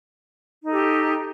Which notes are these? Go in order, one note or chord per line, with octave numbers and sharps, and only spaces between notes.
D#4 G4 A4